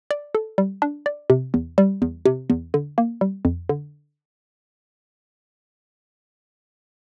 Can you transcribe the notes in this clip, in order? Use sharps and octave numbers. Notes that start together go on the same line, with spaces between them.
D5
A4
G3
D4
D5
C3
E2
G3
E2
C3
E2
D3
A#3
G3
F2
D3